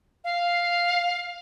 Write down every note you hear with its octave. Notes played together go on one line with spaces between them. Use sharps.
F5